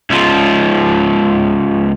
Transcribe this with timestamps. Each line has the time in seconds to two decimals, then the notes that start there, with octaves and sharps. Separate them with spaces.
0.10 C#2 F3